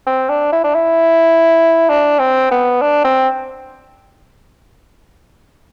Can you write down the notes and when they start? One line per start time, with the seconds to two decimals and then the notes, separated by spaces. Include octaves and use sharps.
0.07 C4
0.29 D4
0.53 E4
0.64 D4
0.75 E4
1.89 D4
2.19 C4
2.51 B3
2.82 D4
3.04 C4